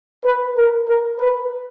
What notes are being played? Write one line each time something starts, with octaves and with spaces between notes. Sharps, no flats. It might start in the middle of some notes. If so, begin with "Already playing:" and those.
B4
A#4
A#4
B4